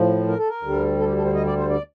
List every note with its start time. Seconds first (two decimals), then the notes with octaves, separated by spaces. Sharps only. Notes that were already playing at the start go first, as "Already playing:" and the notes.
Already playing: A2 F3
0.27 A#4
0.38 A4
0.48 A#4
0.63 D2 D3 G3
0.98 A4
1.07 G4
1.17 A4
1.25 C5
1.34 D#5
1.46 D5
1.58 C5
1.70 D5